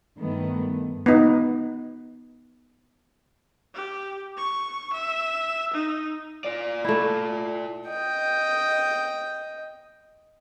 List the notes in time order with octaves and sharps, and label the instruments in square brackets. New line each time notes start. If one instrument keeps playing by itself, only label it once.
[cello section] G2 D#3 A3 B3
[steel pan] B3 D#4
[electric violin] G4
C#6
E5
D#4
[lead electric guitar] F4 D5
[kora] A3 E4
[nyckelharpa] D#5 G5